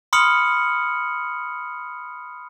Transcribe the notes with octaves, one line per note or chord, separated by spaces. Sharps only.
B5 C6 D#6 F6 C#7 F#7